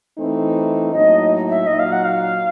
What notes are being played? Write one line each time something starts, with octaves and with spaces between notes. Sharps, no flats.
E3 A3 C4 D#4
A2 F#3 A#3 D#4 D#5
E5
A#2 F#3 A#3 D#4 D#5
F5
F#5
F5